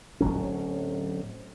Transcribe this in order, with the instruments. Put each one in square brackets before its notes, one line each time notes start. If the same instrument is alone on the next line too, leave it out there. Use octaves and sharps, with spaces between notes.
[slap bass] D1 D#2 F#3 C#4